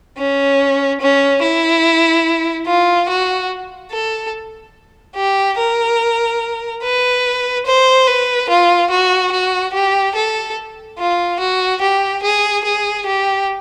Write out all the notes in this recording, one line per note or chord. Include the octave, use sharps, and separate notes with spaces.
C#4
C#4
E4
F4
F#4
A4
G4
A#4
B4
C5
B4
F4
F#4
F#4
G4
A4
F4
F#4
G4
G#4
G#4
G4